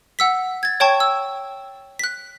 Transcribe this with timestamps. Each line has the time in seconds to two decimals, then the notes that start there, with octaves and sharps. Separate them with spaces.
0.19 F#5 E6 B6
0.63 G#6 A6
0.80 C#5 G5 A5 C#6
1.00 E6
1.99 F#6 B6